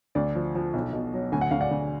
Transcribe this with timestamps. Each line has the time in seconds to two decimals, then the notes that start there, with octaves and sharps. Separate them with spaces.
0.15 D2 D5
0.35 F3
0.55 F3
0.73 B1
0.93 B2
1.14 F#3
1.32 D2 G#5
1.41 F#5
1.51 D2 F5
1.61 D5 F#5
1.71 D2